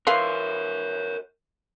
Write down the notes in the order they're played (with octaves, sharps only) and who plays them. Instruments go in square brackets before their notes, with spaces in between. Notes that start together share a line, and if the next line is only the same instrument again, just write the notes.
[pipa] E3 F5 C6 [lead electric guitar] A#4 C#5